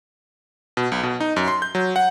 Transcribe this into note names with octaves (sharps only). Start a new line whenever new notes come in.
B2
B1
B2
D#4
F#2
C6
G6
F#3
F#5